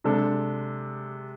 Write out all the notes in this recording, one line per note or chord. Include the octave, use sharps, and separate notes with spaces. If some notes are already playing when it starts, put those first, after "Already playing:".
C3 G#3 D4 A4